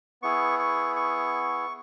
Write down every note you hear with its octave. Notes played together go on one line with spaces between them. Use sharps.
B3 E4 G#4 C#6
C#6
C#6